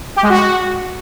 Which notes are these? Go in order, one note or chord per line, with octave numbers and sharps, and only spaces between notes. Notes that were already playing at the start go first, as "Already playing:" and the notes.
G4
G#3
F#4